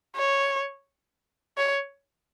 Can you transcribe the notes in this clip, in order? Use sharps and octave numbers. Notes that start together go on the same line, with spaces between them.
C#5
C#5